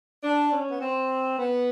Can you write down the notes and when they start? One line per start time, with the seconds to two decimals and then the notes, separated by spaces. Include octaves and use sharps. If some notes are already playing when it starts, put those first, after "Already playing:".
0.23 D4
0.52 C#4
0.69 B3
0.81 C4
1.38 B3